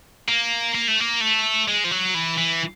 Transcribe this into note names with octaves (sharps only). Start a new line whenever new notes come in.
A#3
A#3
A3
A#3
A3
G#3
F3
F#3
E3
E3